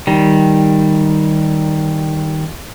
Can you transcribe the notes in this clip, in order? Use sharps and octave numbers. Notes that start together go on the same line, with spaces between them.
D#3 G3